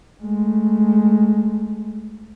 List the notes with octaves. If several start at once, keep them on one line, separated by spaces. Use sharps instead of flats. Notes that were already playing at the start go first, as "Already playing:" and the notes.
G#3 A3